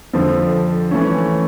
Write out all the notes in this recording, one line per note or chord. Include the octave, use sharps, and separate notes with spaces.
F2 D3 F3
E3 A3 C#4